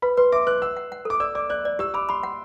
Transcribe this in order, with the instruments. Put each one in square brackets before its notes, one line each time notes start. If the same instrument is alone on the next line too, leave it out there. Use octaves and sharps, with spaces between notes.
[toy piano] B4 [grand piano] B5
[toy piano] B4 [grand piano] C6
[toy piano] E5 [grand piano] D6
[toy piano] B4 [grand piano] F#6
[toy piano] F#5 [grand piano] E6
[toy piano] F#5
F#5
[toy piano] A4 [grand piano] D6
[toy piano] D5 [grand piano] E6
[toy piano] D5 [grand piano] D6
[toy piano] D5 [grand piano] F#6
[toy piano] D5
[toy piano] G4 [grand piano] E6
[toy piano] B5 [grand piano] D6
[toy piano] B5 [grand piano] C6
[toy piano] F#5